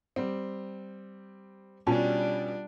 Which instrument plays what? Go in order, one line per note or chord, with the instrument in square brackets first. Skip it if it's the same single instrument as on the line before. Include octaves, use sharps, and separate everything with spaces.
[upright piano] G3 C4
[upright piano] B2 C#4 [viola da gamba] G3 D4 [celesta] F4 A5